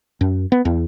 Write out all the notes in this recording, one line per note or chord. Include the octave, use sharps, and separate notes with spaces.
F#2
B3
E2